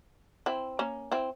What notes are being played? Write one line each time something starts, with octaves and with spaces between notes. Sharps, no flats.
C4 E4
A#3 C#4
C4 E4